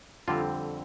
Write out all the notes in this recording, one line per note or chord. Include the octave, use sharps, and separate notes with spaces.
F2 D3 G3 C4 F4